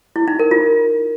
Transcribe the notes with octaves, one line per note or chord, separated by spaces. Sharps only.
E4
D#4
A#4
F4